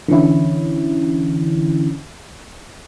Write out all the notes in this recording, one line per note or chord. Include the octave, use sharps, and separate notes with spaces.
D3 E3 C#4 E4